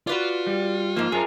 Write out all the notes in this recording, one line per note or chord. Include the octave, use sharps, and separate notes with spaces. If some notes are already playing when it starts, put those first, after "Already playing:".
F4 F#4 B4 D5
G3
G#2 F3 A#3
F#2 G#4 A#4